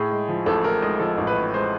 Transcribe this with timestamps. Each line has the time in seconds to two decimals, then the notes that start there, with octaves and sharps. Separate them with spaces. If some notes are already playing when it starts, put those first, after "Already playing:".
Already playing: A2 G#4
0.11 G#3
0.29 F3
0.46 A1 A4
0.64 A2 A#4
0.82 G#3 D#5
1.00 F3 A4
1.18 A1
1.27 B4
1.36 A2
1.54 G#3 C5